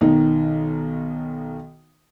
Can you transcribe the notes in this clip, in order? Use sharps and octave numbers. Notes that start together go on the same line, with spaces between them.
B1 D#3 D#4